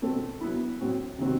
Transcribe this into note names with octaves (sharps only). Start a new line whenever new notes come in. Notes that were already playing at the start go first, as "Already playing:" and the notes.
B2 A3 C4
F#3 B3 E4
A2 F#3 C4 F#4
C3 D#3 F#3 C4 F#4